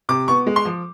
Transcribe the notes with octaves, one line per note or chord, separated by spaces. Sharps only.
C3 D6
B3 C#6
G#3
C6
F3